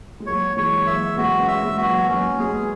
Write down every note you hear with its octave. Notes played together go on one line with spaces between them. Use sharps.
G#3
F#3 A#3 C#5
E3 G#3 C#5
F#3 A#3 E5
G#3 B3 F#4
A#3 C#4
E5
A#3
G#3 B3
F#4
F#3 A#3
F#3 A#3 C#4
G#3 B3 G#4